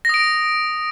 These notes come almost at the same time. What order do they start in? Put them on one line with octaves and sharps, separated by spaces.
A#6 D#6 D7